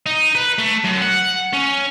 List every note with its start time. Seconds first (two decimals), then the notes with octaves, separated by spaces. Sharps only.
0.06 D#4
0.35 B4
0.58 A3
0.85 F#2
1.02 F#5
1.53 C#4